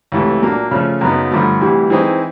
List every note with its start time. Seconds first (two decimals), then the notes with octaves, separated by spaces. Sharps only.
0.12 C#2 C3 E3 A3
0.42 A#2 F#3 A#3 D4
0.71 C#3 F3 A3 C#4
1.01 F#2 C#3 F#3 B3 D#4
1.31 G2 D3 F3 A3
1.61 D2 C3 E3 G3
1.90 E3 G#3 C4 D#4